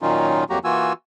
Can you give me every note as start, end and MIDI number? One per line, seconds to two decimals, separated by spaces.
0.02 0.44 46
0.02 0.44 51
0.02 0.44 54
0.02 0.44 61
0.02 0.44 63
0.02 0.44 65
0.50 0.59 41
0.50 0.59 54
0.50 0.59 58
0.50 0.59 66
0.50 0.59 67
0.50 0.59 82
0.64 0.93 52
0.64 0.93 58
0.64 0.93 65
0.64 0.93 66
0.64 0.93 80
0.64 0.93 88